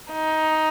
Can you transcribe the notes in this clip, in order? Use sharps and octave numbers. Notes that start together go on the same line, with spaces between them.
D#4